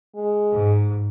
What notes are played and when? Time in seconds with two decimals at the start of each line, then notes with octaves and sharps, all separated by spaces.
0.16 G#3
0.52 G#2